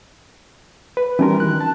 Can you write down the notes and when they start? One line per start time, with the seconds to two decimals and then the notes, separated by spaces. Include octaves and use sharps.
0.97 B4
1.19 E3 G3 C#4 D#4 F#4 A#4
1.40 D#3 F#6
1.60 A5